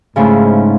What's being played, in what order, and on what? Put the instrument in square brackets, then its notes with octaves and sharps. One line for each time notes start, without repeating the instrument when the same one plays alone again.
[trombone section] G#2 [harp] C#3 F3 A3 C#4 E4